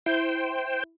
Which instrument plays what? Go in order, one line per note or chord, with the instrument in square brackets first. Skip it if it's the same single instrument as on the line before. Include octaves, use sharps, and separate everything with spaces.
[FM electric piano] E4 [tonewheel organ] C5 G5